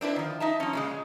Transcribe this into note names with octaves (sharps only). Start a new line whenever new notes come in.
C4 D4 E4 B4
D#3 F3
D#4 E5 A5
F3 C#4
A#2 C#3 G#3